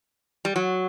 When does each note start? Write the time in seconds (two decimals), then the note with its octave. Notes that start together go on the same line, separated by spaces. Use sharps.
0.45 G3
0.56 F#3